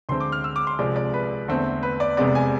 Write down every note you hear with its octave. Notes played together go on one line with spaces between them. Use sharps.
D2 D3 G#3 C4 C6
D6
F6
E6
D6
C6
C2 C3 F3 G#3 D5
D5
B4
E2 D3 A3 C4
B4
D5
F1 E2 C3 G#3 B3 D5
G#5